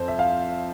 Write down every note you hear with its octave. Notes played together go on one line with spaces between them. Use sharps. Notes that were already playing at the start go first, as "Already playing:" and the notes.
Already playing: F2 C5
E5
F5